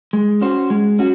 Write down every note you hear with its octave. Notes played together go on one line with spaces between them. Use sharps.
G#3
C#4 F#4 C5
G#3
C#4 F#4